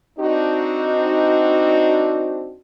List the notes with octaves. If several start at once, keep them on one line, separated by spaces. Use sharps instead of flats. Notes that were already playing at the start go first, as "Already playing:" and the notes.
C4 D4 D#4 F#4